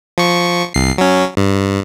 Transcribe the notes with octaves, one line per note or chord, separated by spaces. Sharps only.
F3 C#6
C2 C7
F#3 C#4
G2